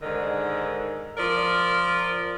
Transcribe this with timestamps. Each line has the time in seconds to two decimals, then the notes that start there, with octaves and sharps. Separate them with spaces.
0.02 G#2 D3 D#3
1.17 F3 A#4 D5